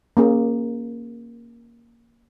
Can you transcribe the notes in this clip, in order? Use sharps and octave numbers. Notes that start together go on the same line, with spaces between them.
A#3 C#4 G#4